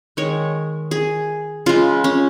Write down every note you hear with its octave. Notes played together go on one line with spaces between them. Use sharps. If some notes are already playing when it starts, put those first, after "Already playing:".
D#3 G#3 C#5
G#4
C#3 G#3 F4
C#4